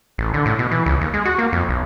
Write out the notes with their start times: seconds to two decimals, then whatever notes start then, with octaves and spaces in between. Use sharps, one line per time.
0.18 A1
0.34 D3
0.46 A2
0.59 B2
0.71 E3
0.86 C#2
1.01 D#2
1.14 G#3
1.25 F#4
1.38 A#3
1.52 F2
1.69 B1